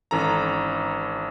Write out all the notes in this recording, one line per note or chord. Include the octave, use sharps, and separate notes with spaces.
G#1 E3 C#4 A4 A#5